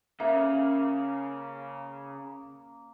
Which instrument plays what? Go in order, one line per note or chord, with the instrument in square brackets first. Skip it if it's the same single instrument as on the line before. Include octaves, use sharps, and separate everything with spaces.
[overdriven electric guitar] C#3 [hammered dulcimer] A#3 [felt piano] C#4 [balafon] E5